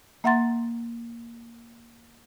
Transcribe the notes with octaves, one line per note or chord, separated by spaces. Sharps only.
A#3 E5 F#5 A#5 C6 A6